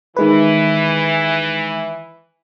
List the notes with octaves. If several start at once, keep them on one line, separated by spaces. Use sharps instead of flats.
D#3 E3 G#3 B4